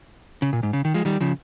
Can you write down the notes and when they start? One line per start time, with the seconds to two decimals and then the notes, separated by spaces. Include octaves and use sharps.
0.42 C#3
0.53 A#2
0.63 G#2
0.73 C#3
0.85 D#3
0.94 F3 G#3
1.05 D#3 G3
1.21 C#3 F3